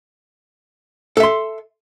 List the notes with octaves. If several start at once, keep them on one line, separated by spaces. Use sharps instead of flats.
A4 E5 C6